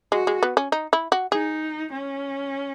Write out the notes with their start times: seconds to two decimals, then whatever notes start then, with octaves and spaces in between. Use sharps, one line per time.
0.12 G#3 F#4
0.27 G#3
0.43 B3
0.57 C#4
0.72 D#4
0.93 E4
1.12 F#4
1.32 D#4 G#4
1.92 C#4